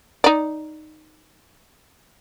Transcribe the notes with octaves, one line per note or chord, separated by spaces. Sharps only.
D#4 D5